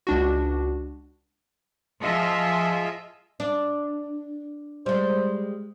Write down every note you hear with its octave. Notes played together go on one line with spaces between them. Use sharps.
C#2 D4 F#4
F3 F4 G#4 D#5 E5
D4
G3 G#3 C5